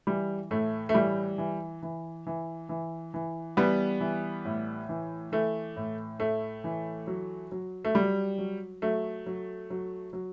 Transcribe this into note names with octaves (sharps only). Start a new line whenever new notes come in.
E3 G3
A2 A3
A3
E3 G3
E3
E3
E3
E3
E3
E3 G3 B3
E3
A2
E3
E3 A3
A2
A2 A3
E3
F#3
F#3
A3
F#3 G3
F#3
F#3 A3
F#3
F#3
F#3